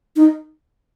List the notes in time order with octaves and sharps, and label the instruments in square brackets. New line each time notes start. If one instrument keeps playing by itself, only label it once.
[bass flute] D#4